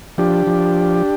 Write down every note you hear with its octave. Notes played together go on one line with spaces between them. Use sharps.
F3 D4 G4
F3